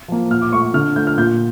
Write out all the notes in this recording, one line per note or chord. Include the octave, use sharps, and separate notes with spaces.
F3 A#3
A#2 F6
D6
A3 C#6
D3 F6
A3 G6
F6
A#2 G6